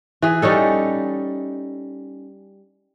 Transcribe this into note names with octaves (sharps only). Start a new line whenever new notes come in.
E3 G#4
G3 C#4 D#4 A4